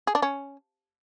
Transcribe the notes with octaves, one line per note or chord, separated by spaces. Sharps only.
G#4
D4
C#4